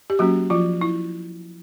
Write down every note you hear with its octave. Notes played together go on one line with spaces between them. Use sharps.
G4
F#3 A#3 C#4 F#4
F3 F4
E4